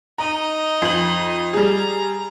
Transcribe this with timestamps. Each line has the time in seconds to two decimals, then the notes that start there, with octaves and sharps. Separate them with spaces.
0.18 D#4 D#5 A#5
0.82 F2 F#7
1.53 G3 G#4 A#5